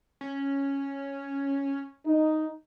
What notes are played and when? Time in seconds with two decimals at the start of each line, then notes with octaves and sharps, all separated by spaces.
0.21 C#4
2.06 D#4